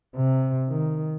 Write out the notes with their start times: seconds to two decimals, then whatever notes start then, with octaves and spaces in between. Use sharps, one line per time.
0.16 C3
0.69 D#3